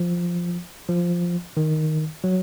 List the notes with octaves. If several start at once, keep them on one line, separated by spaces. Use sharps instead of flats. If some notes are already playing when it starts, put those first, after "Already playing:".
Already playing: F3
F3
D#3
F#3